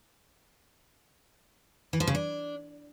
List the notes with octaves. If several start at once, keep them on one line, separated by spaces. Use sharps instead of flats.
E3
F3
C#3
D4